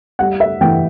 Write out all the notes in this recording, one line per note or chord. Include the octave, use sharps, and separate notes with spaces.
G3 F#5
E5
E3 G5